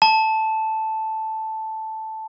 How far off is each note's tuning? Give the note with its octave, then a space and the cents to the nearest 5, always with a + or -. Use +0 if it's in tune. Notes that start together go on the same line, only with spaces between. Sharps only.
A5 +0